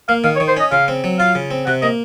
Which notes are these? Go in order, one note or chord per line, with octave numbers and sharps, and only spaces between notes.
A#3 F5
D#3 F5
C#5
D#3
C5
C#4 D#5
C#3 F5
C4
F#3
F4 F5
C#3
C4
C3 F#5
A#3 D#5